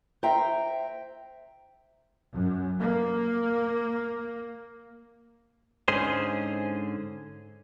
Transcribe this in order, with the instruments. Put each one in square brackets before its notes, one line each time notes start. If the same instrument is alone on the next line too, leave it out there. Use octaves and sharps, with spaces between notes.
[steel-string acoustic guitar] C5 E5 G5 A#5
[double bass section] F#2
A#3
[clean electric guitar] G#2 D3 C#4 G#4 C5